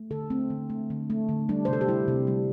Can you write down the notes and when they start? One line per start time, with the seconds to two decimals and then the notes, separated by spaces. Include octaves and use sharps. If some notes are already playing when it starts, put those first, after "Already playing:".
Already playing: A3
0.11 D3 A4
0.30 A3 C4
0.50 D3
0.70 A3
0.90 D3
1.10 A3
1.29 D3
1.49 G3 D4
1.65 C5
1.68 C3 A4
1.81 G4
1.88 G3 E4
2.08 C3
2.27 G3